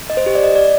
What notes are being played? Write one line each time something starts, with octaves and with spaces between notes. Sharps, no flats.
D#5
C5
G4
D5
D#5
D5